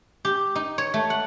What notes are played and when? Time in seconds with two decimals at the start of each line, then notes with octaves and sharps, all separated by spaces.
0.25 G4
0.55 D#4
0.78 C#5
0.94 A3
1.10 F#5